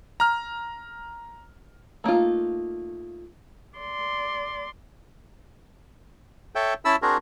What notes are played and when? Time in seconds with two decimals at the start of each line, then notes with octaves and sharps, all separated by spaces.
0.20 A#5 F6
2.04 A3 A#3 D#4 F4
3.79 D5 C6
6.55 A4 C#5 E5 G5
6.85 C#4 E4 A5 B5 E6
7.02 C4 D4 F#4 G#4 A#4